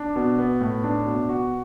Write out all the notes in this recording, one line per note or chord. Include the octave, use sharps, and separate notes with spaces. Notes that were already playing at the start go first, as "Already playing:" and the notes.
Already playing: D4
B2
B3
A2
D4
B2
F#4